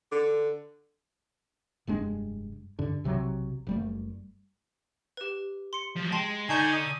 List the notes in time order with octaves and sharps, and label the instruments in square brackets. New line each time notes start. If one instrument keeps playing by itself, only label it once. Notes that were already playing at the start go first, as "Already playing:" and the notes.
[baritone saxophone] D3
[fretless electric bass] F1 G2 G#3 D4
G2 D3
B1 C3 F3 F#3
F#1 G3 A3
[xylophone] G4 B4
C6 C#7
[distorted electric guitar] F3 F#3
[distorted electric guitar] G#3 [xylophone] G5 A5 C6
[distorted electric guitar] D3 [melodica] D#4 G#5 [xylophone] A5 C#6 G6
[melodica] D#6